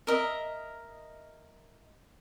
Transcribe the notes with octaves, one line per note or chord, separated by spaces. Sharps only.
A#4 D#5 E5